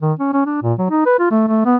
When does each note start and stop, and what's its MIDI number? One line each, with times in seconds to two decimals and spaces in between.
0.02 0.13 51
0.19 0.31 61
0.33 0.43 61
0.46 0.58 62
0.63 0.73 46
0.79 0.87 54
0.90 1.01 63
1.06 1.16 71
1.19 1.26 65
1.31 1.44 57
1.48 1.61 57
1.65 1.76 59